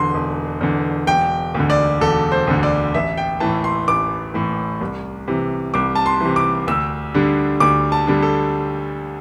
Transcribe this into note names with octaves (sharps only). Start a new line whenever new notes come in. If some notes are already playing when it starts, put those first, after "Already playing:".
Already playing: E1 E2 D3 C6
E1
E2 D3
E1 G5
D2 D3
D5
E1 A4
C5
D2 D3
D5
A1 E5
G5
A2 E3 A5
C6
A1 D6
A2 E3
C2
C3 E3
C2 D6
A5
C6
C3 E3
D6
D2 E6
D3 G3 D4
D2 D6
A5
D3 G3 D4
A4